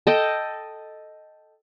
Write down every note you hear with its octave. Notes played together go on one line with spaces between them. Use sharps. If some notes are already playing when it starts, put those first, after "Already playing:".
A4 D#5 G5